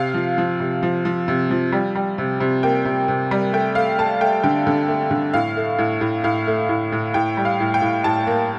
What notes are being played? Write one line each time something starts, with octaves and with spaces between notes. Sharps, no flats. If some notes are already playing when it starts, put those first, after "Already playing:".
Already playing: C3 F5
F3
F3
C3
F3
F3
C3
F3
G3
G3
C3
C3
A#3 G5
C3
C3
G3
A3 G5
A3 F5
A3 A5
A3 G5
D3 G5
D3
A3
D3
A2 F5
A3
A2
A2
A2 F5
A3
A2
A2
A2 G5
G3
F5
A2
G5
A2
A2 A5
A#3